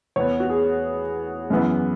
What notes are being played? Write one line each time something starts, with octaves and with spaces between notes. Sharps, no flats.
E2 E3 B3 C#5
F#4
G#4
F#2 E3 B3